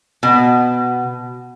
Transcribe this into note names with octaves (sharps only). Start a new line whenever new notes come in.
B2